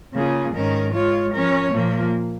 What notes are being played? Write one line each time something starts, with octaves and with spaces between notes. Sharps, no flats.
C#3 A#3 F4 G#4
G#2 D#3 C#4 A#4
G#3 F4 C#5
F3 C#4 A#4 C#5
A#2 F3 A#3